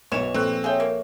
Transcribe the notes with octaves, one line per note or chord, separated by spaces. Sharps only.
B1 E3 C#5 E7
A#1 C4 A4 C#6 F#6
G#4 C#5 E5 F5 G5
A#3